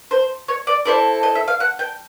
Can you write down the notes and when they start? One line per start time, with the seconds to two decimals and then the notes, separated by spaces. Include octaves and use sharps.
0.11 C5
0.48 C#5
0.67 D5
0.85 C4 E4 A4 D5
1.23 D#5
1.35 E5
1.48 F5
1.60 F#5
1.79 G5